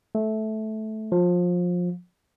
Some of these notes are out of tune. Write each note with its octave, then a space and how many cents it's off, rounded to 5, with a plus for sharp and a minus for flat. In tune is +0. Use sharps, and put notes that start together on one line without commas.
A3 -15
F3 +25